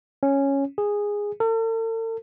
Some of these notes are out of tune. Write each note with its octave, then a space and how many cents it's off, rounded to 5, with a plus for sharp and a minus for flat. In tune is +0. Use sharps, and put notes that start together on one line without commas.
C#4 -5
G#4 -10
A4 +45